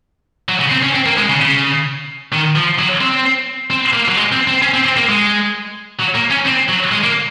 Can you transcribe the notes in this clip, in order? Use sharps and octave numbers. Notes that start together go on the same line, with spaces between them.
F#3
C#3
C4
C#4
C4
A#3
G#3
C#3
C#3
D#3
F3
F#3
C4
C4
A#3
F#3
G#3
C4
C4
C#4
C4
C4
A#3
G#3
F#3
A#3
C#4
C4
F#3
G#3
A#3